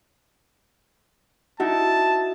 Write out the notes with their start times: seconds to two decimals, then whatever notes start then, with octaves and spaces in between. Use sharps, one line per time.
1.60 D#4 E4 F#4 A5